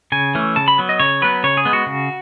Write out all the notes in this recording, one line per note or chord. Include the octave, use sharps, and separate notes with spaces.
C#3 G#5
E3 A3 C#4
C#3 A5
B5
F#3 B3
D#5
C#3 C#5
F#3 B3 B4
C#3 C#5
G#4
G#3 B3
F#4
C#3